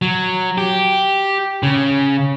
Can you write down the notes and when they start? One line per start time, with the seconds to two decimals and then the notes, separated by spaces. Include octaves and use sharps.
0.02 F#3
0.58 G4
1.63 C#3